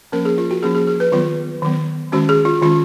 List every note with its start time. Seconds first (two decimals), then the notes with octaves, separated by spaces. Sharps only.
0.12 F3 A#3 C#4 A#4
0.25 G#4
0.38 F4
0.51 F#4
0.63 F3 A#3 C#4 G#4
0.75 G#4
0.87 G#4
1.00 B4
1.12 D#3 F#3 B3 F4
1.62 D#3 F#3 B3
2.12 D#3 G#3 C#4 F#4
2.29 G#4
2.45 F4
2.62 D#3 G#3 C#4 F4